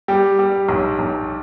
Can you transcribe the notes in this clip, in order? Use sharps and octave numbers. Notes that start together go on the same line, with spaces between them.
G3 G4
G3
B1
B1